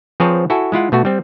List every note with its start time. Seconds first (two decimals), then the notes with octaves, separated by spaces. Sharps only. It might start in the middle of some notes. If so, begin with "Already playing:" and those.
0.20 F3 C4 G#4 B4 C#5 A5
0.50 E4 F#4 A4 G#5
0.72 G#3 E4 F4 F#5
0.92 B2 A3 F#4
1.05 G3 C4